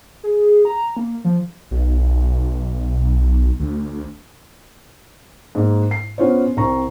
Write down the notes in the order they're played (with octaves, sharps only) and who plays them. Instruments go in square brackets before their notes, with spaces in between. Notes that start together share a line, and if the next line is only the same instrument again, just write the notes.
[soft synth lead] G#4
A#5
A#3
F3
[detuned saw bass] B1
D2
[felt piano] G#2 A#3
C7
B3 C#4 F4 C5 C#5
C2 C4 A#5 C#6